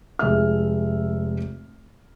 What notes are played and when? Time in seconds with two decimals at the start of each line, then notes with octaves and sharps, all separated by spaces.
0.19 F1 G#3 E5 F6